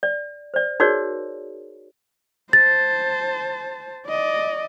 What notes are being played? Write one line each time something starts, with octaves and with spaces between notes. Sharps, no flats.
D5
C5 D5
D#4 F#4 G#4 A#4 C#5 D5
C5 A5 A6
D5 D#5